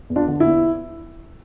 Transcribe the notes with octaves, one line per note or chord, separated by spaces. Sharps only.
E2
D4 F4
D3
E4
E2